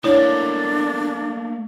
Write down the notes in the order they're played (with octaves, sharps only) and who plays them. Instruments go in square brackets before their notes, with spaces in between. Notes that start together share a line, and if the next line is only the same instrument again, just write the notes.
[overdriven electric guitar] A3 A#3 [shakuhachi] D4 [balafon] E4 C#5